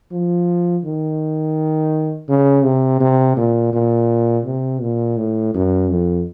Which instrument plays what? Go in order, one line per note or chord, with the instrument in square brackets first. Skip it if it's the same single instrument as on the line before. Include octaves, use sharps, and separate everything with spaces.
[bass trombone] F3
D#3
C#3
C3
C3
A#2
A#2
C3
A#2
A2
F#2
F2